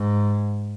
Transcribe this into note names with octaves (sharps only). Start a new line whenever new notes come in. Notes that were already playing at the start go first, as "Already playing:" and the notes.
Already playing: G#2